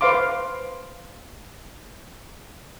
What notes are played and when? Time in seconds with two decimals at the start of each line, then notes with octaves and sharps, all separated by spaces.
0.01 B4 C5 F5 C6 D6